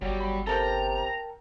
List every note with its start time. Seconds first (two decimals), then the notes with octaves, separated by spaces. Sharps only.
0.01 G1 F#3 G3
0.20 B5
0.47 C3 A4 A#4 G5 A#5